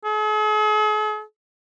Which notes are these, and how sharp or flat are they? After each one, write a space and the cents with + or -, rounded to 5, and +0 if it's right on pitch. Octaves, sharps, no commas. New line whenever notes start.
G#4 +45